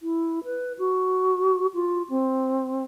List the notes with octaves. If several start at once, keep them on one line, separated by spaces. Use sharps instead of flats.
E4
B4
F#4
F4
C4